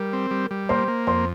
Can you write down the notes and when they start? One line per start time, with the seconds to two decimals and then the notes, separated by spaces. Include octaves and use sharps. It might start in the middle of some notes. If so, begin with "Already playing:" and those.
Already playing: G3 A#4
0.13 C4
0.31 G3
0.51 G3
0.69 A#3 C5 C6
0.88 A#3
1.07 F2 C5 C6